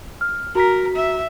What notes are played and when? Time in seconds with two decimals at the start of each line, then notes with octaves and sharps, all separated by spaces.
0.21 F6
0.55 F#4 A#4 A#5 B6
0.95 E5